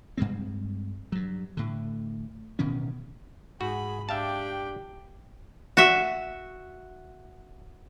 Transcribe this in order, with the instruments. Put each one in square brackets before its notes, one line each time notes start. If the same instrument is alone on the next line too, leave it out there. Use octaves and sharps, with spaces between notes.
[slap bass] G2 G3 G#3 C4
G2 F#3
A2 D3
D1 B2 D#3 C#4
[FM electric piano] G#2 [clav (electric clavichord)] F#4 [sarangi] G#4 [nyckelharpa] B5
[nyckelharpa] D4 G5 [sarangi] G4 [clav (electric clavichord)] E5 F5 A5
[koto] F#4 E5